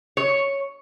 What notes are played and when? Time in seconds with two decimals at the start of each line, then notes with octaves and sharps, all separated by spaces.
0.17 C#5